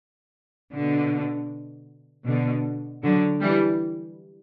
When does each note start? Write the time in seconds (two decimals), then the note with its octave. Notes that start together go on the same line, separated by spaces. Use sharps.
0.73 B2 D3
2.26 B2 D3
3.03 D3 F#3
3.41 E3 G3